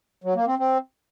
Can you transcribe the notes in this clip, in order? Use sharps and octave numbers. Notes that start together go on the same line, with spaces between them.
F#3
A#3
C4
C4